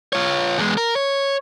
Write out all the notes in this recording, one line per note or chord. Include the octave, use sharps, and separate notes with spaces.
F4 C#5
E2 G#3
A#4
C#5